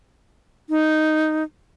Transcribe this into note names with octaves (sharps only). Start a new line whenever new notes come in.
D#4